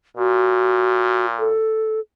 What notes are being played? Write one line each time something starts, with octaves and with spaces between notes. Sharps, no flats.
A#2 F#4
A4